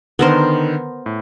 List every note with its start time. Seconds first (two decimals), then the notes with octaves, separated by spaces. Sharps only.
0.19 D3 D#3 B3 A#4 C5
1.06 A2